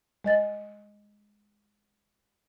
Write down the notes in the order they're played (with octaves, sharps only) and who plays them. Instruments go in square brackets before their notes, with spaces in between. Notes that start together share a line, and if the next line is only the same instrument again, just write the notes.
[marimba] G#3 D#5 A6